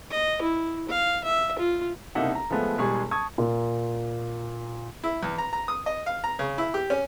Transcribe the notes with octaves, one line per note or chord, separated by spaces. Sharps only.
D#5
E4
F5
E5
F4
F#1 C2 A#3 D#4 E5 F#5
A#5
F3 G#3 A3 B3
E1 G3 G#3 G#4 C#6
A5 C#6 D#6 G#6
A#2
E4
E2
A#5
A#5
D#6
D#5
F5
A#5
C#3
E4
G4
C#4